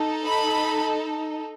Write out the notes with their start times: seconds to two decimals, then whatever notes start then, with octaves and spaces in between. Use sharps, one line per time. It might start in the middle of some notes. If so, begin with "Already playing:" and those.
Already playing: D#4 A4
0.25 B5